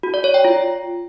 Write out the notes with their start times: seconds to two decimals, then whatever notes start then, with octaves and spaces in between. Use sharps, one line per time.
0.03 F#4
0.14 D5
0.24 C#5
0.34 G5
0.45 F4